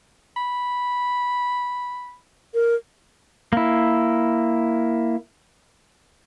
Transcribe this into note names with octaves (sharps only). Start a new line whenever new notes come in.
B5
A#4
A#3 E4